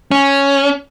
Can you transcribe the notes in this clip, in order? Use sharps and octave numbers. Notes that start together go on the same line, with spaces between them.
C#4